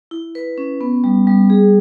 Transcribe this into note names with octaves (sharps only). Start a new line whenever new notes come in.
E4
B4
C#4
B3
G3
G3
G#4